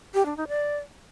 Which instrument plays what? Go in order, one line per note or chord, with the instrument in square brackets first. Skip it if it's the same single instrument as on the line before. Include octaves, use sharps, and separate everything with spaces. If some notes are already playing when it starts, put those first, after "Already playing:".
[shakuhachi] G4
D4
D#4
D5